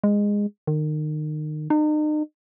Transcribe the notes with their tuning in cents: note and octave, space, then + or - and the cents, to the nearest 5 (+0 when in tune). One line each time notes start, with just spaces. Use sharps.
G#3 -15
D#3 -30
D#4 -40